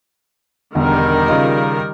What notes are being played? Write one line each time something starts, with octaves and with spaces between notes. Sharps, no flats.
E1 D3 D#3 G3 A#4
C#3 F4 D#5